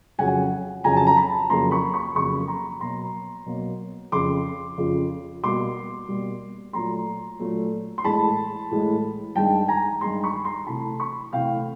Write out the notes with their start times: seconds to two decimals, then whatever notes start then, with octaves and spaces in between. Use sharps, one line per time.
0.18 F2 C#3 F#3 F#5 G#5
0.84 F2 C#3 F#3 G#5 A#5
0.97 A5
1.07 A#5
1.17 A5 B5
1.50 F2 C#3 F#3 A#3 A#5 C6
1.71 B5 C#6
1.94 B5 C#6
2.15 F2 C#3 F#3 A#3 B5 C#6
2.48 A#5 C6
2.81 B2 F#3 A#3 A#5 C6
3.46 B2 F#3 A#3
4.12 F2 C#3 F3 C6 D6
4.78 F2 C#3 F3
5.43 B2 G3 A#3 C6 D6
6.09 B2 G3 A#3
6.73 A#2 F#3 A3 A#5 C6
7.39 A#2 F#3 A3
7.98 C6
8.04 A2 E3 G#3 A5 B5
8.71 A2 E3 G#3
9.36 G2 D#3 G#3 G5 A5
9.68 G#5 A#5
10.01 G2 D#3 G#3 A#5 C6
10.24 B5 C#6
10.45 A#5 C6
10.67 C3 E3 A3 A5 B5
11.00 B5 C#6
11.33 C3 E3 A3 F5 G5